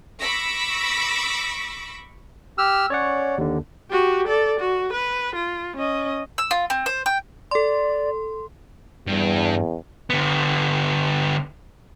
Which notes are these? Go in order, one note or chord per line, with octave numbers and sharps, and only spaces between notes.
B5 C#6 D6 E6 A#6 B6
G4 E6 F6
C#4 C#5 D5 F#5
D#2 D3
F#4 G4
A4 D5
F#4
B4
F4
C#4 D#5
E6
F4
C4
C5
G5
A4 D5 C6
E2 G2
D3 B3